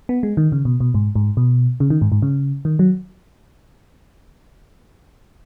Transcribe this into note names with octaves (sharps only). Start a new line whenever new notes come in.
B3
G#3
D#3
C#3
B2
B2
G#2
G#2
B2
C#3
D#3
G#2
G#2
C#3
D#3
F#3